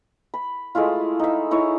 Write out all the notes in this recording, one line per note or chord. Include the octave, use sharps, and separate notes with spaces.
B5
G#3 A3 E4 F4
D#4 E5
D#4 E4 C#5